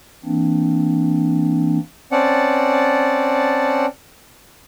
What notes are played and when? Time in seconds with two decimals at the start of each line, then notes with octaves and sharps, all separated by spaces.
0.24 E3 A#3 C4 D4
2.12 C4 C#4 D5 F#5 A5